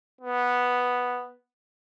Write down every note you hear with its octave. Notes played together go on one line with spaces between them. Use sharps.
B3